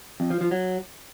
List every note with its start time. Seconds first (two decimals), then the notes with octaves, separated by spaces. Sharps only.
0.20 F2
0.30 F3
0.41 F3
0.51 F#3